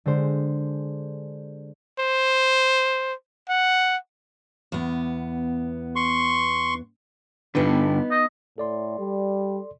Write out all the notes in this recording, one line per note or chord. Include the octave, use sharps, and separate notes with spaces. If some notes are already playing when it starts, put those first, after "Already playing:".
D3 G#3 G4 C5
C5
F#5
E2 B3
C6 C#6
G2 D3 B3 D#4 B4
D#5
A2 A4 D5 C6
G3